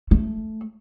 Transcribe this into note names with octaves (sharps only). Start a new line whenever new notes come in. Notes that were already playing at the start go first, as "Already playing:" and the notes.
A3